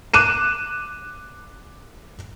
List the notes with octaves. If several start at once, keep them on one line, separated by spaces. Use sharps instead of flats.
D6 F#6 D#7 E7